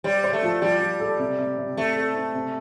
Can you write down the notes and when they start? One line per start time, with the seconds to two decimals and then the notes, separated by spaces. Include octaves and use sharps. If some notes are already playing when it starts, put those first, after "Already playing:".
0.04 G3 C5
0.24 C5
0.33 A3
0.42 F3
0.62 F3 G3
0.81 F3
1.00 A4
1.19 C3
1.38 C3
1.58 C3
1.76 A3 C4
1.96 A4
2.15 C4
2.34 C3